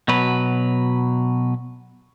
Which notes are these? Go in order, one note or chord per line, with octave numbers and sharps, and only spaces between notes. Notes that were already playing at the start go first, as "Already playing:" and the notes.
B2 F#3 B4